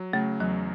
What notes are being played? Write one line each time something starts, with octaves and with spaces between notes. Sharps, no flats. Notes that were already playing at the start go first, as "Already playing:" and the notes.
Already playing: F#3
C#3 A3
E2 F#3